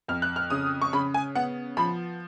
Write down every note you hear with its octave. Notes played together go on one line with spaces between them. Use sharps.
F2 F6
F#6
F6
C#3 D#6
C#6
C#3 B5
G#5
B3 F#5
F3 B5